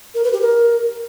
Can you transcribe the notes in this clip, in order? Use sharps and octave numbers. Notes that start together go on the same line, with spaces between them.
A#4
B4
G4
A#4